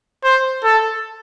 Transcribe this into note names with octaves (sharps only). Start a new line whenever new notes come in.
C5
A4